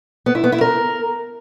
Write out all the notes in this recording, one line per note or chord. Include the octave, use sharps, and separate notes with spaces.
B3
E4
B3
E4
A#4